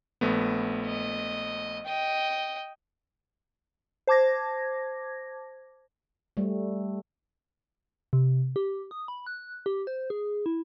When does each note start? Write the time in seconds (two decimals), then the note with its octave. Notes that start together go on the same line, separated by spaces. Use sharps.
0.21 A#1 A3 B3
0.86 D#5
1.86 D#5 G5
4.07 C5 A5 D6 G#6 A#6
6.37 G3 A3
8.13 C3
8.56 G4
8.91 D#6
9.08 B5
9.27 F#6
9.66 G4
9.87 C5
10.10 G#4
10.46 E4